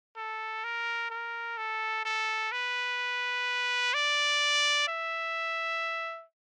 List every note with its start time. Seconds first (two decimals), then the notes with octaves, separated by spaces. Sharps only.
0.17 A4
0.64 A#4
1.11 A#4
1.57 A4
2.05 A4
2.52 B4
3.94 D5
4.88 E5